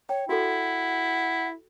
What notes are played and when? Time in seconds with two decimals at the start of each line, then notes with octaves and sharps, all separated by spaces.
0.09 C#5 G5
0.29 E4 F#4 A4 F#5